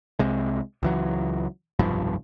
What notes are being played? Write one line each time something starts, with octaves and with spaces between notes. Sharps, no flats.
C2 C3 G#3
C#2 E3 F#3
F1 B1 G2 F3